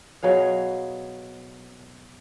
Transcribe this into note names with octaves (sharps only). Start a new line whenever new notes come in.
B2 F#3 G#4 F5